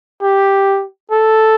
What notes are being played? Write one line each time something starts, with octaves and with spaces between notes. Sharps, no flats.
G4
A4